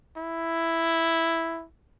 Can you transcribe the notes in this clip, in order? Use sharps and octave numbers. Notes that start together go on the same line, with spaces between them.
E4